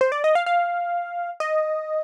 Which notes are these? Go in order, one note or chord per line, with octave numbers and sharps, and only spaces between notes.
C5
D5
D#5
F5
F5
D#5